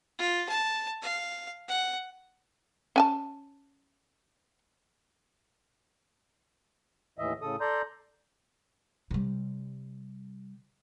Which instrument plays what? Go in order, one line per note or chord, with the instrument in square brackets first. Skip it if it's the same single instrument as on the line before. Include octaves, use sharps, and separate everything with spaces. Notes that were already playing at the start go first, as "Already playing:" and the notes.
[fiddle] F4
A5
F5
F#5
[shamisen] C#4 G#5 A5
[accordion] D#2 A2 E3 D#5 E5
A2 C#3 A4 D#6
A4 D5 A#5 C6 G6
[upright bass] C3 G3